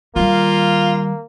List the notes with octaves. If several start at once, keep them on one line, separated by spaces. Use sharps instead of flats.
D#3 G3 A#3 F4